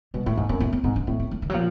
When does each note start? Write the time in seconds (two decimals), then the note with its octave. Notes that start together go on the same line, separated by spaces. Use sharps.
0.14 B2 G3
0.26 A2 A3
0.37 G#2 A#3
0.49 F#2 B3
0.60 A2 A#3
0.73 B3
0.84 G#2 C4
0.96 D4
1.07 A2 C4
1.19 B3
1.31 A3
1.42 D#3
1.50 F#3
1.54 A#2 F3